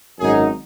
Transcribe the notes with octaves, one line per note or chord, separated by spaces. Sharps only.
G#1 F#2 F#3 D#4 G#4